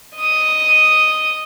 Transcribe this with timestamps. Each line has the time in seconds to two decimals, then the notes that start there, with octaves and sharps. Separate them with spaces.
0.18 D#5 D#6